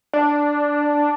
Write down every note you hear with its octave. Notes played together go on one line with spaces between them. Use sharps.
D4